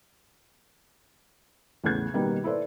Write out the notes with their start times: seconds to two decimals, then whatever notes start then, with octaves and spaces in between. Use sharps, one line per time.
1.84 E2 A2 C#3 F#6 G#6
2.14 B2 D#3 G3 A#3
2.44 E4 A4 B4 C5 D5